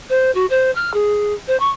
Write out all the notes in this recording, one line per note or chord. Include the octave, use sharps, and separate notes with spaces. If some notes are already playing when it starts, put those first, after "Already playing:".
C5
F#4
C5
F6
G#4
C5
C#6